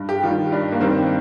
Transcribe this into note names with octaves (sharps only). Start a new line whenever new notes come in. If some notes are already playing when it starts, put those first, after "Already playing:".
Already playing: G2
G4
D#3 G3 F4
G2 D4
A#3
D#3 G3 C4